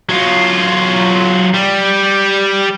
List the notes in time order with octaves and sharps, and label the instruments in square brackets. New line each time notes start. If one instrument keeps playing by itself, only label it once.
[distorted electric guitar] F#3 F4
G3